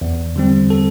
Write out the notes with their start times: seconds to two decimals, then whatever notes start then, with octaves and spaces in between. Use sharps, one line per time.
0.01 E2
0.36 D3 G3 C4
0.70 A4